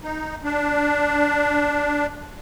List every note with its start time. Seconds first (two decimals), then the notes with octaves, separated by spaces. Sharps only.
0.03 D#4
0.44 D4